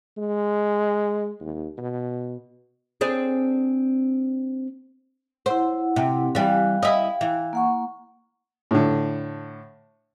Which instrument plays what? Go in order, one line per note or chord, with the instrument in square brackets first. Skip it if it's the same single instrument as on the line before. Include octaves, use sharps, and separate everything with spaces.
[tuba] G#3
D#2
B2
[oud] C4 D4 G#4
[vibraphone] E4 F#5 [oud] C5
[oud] C3
[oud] E3 G3 [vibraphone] F5 G5
[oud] E4 D#5
E3
[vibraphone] A#3 F#5 C#6
[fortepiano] A2 D3